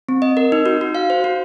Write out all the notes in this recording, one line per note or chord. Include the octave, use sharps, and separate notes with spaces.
C4
D#5
A#4
D#4
F#4
F#4
F5
C5
F#4